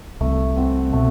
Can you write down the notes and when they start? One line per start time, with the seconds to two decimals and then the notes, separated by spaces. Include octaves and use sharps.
0.21 C2 C3 A3
0.57 C4 F#4
0.93 B2 A3